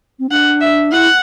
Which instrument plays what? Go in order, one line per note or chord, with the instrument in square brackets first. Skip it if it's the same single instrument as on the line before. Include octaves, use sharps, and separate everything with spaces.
[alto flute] C4
[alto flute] D4 [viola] F#5
[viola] E5
[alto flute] E4 [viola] F#5